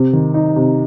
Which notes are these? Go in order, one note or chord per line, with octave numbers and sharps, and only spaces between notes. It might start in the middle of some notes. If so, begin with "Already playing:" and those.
Already playing: C3
D#3
D#4
C3